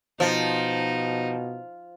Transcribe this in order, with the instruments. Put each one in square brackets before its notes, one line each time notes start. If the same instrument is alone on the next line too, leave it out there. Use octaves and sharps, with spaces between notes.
[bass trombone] B2 [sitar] F3 [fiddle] D#4